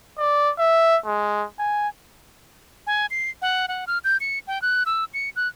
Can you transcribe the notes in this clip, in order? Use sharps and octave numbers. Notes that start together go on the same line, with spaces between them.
D5
E5
G#3
G#5
G#5
C7
F#5
F#5
F6
G6
C#7
G5
F#6
E6
C#7
F#6